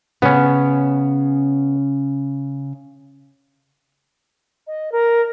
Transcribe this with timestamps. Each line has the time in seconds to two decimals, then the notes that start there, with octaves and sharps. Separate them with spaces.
0.22 C#3 B3 C#4
4.67 D#5
4.92 A#4